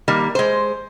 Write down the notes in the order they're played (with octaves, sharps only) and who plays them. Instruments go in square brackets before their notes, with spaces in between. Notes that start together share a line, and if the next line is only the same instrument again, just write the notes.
[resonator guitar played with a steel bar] D#3 G3 A#3
G#3 C5